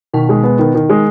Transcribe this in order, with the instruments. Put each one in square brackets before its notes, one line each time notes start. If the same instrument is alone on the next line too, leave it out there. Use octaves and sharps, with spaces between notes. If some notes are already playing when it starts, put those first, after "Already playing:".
[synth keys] B2 [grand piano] D#3
[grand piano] G#3
B3
D#3
D#3
G#3